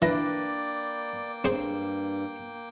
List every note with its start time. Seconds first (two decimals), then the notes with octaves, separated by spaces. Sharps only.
0.02 E3 A#3 D4 B4 D5 G5 A#6
1.44 G2 C4 G#4 C5